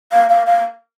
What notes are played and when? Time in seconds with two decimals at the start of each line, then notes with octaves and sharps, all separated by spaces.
0.12 F5
0.30 F5
0.46 F5